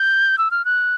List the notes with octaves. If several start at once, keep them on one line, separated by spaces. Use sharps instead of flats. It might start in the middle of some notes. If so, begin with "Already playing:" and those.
Already playing: G6
E6
F6
F#6